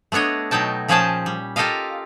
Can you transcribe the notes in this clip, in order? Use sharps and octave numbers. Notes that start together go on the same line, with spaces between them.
A3 B3 D4 C#5 D#5
B2 F#3 D#4 G5 A5
A#2 F3 C#4 G#4 G5 A5
G3
F4 G4 A4 A#4 D#5 F5